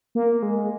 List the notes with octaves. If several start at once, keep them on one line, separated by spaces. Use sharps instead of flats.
A#3
G#3